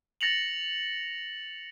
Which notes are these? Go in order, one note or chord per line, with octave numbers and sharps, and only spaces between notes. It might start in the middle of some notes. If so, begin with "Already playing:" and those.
A6 A#6 C#7 F7 F#7